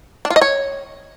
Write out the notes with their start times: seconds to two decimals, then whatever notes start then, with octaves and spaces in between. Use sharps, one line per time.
0.25 D4
0.30 F4
0.36 D#5
0.41 C#5